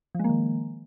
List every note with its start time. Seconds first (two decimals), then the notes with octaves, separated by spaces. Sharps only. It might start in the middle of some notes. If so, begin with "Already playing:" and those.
0.15 F3
0.19 G#3
0.24 A#3
0.29 D#3